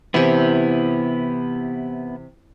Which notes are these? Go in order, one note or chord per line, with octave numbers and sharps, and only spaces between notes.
C3 E3 B3 E4